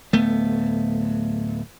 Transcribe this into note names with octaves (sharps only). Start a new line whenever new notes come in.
D1 A3 B3